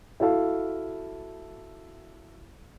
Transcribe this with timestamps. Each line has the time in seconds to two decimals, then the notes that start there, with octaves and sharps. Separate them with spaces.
0.20 E4 F#4 A4 F5